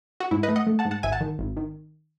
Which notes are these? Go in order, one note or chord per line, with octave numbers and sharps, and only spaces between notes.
F#4
G#2 E4
B4 D#5
A3
D#5 F#5
A3
F#5 A5
G#2
F#5 A5
G#1 E5 G#5
F#5 A5
D#3
G#1
D#3